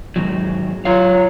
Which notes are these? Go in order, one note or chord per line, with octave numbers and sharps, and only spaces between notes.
G#2 D#3 F#3
F#3 F4 C#5 F5